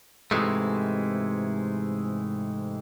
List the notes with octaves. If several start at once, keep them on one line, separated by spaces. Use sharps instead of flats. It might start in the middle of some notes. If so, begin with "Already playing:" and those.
G#2 C3 E3 G#3 A3